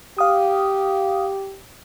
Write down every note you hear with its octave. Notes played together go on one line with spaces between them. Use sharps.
G4 F5 D#6